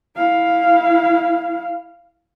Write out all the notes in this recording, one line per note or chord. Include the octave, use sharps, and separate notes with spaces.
E4 F5